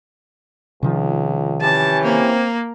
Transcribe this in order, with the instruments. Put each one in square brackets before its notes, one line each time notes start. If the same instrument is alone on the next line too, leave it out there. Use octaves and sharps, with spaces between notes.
[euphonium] C#2 [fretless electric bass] C3 D#3 F3
[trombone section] E3 C#4 G4 [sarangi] A5
[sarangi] A#3 [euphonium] C4